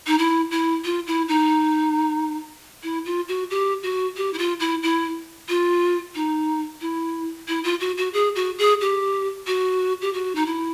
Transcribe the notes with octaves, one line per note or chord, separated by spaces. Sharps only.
D#4
E4
E4
F4
E4
D#4
E4
F4
F#4
G4
F#4
G4
E4
F4
E4
E4
F4
D#4
E4
E4
F4
F#4
F#4
G#4
F#4
G#4
G4
F#4
G4
F#4
D#4
E4